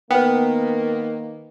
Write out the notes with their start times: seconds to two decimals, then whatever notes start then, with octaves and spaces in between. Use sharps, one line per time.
0.10 D#3 A#3 B3 B4 G5